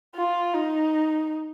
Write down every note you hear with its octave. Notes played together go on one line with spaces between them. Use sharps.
F4
D#4